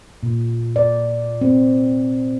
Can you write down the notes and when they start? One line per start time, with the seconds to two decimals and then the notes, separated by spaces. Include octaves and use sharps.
0.23 A#2
0.76 D5
1.41 C4